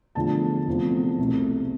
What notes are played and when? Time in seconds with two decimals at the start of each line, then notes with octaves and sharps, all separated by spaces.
0.15 E2 D3 F3 A3 A5
0.67 E2 C3 F3 A3
1.18 C2 B2 A3